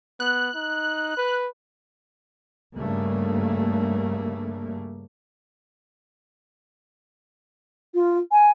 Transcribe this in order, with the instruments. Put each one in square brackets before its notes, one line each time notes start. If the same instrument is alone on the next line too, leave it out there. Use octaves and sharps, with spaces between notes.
[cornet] B3 [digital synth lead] F#6
[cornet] D#4
B4
[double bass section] G2 C#3 A3 A#3
[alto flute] F4
G#5